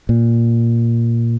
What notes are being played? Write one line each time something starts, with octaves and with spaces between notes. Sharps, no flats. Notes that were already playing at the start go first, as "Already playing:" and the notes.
A#2